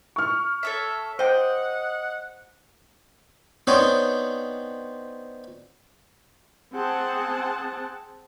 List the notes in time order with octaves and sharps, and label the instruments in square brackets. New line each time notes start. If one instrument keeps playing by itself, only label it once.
[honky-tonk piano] C#6 F6
[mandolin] A4 C#5 E5
[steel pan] C5 G5 [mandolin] D#5 [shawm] F#5
[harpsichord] B3 C4 D4 D#4 C5 C#5
[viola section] C4 G#4 F#5 A5